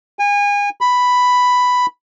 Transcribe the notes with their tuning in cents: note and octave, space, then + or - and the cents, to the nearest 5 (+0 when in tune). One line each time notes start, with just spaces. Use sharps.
G#5 -30
B5 +5